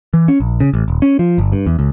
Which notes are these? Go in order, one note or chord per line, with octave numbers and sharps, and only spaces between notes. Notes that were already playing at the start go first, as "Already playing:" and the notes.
E3
C#4
A#1
C#3
A1
D#1
C#4
F3
G1
G2
E2
C#2